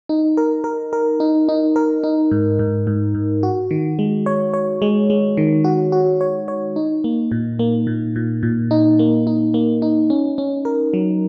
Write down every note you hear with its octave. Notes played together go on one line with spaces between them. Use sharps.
D#4
A#4
A#4
A#4
D#4
D#4
A#4
D#4
G#2
G#2
G#2
G#2
F#4
D#3
G#3
C#5
C#5
G#3
G#3
D#3
F#4
F#4
C#5
C#5
D#4
A#3
A#2
A#3
A#2
A#2
A#2
D#4
A#3
D#4
A#3
D#4
C#4
C#4
A#4
F#3